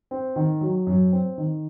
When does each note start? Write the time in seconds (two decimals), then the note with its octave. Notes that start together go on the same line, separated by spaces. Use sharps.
0.11 C4
0.36 D#3
0.61 F#3
0.87 F#2
1.12 C4
1.38 D#3